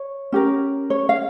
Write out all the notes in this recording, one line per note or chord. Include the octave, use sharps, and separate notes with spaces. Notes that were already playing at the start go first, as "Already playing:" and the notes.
Already playing: C#5
C#4 G4 A#4
C#5
F5